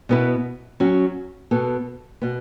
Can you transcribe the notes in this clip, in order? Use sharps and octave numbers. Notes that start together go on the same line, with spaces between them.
B2 B3 E4 B4
F#3 C#4 F#4
B2 B3 A4
B2 B3